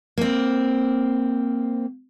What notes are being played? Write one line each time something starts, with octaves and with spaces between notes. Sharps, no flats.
A#3 C4